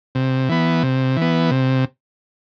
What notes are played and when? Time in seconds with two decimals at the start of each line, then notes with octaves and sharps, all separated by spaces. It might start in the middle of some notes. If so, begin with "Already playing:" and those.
0.15 C3
0.49 E3 B3
0.83 C3
1.17 E3 B3
1.51 C3